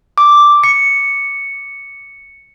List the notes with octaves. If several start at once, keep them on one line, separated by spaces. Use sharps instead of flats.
D6
C#7